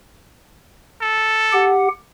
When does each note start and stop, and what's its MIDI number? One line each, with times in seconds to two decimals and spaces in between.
1.01 1.75 69
1.53 1.88 67
1.53 1.88 78